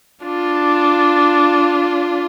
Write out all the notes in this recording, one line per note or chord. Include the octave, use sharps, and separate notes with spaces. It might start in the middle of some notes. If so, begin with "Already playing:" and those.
D4 F4